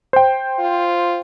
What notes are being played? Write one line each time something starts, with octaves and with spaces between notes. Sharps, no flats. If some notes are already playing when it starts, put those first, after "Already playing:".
C5 G5
F4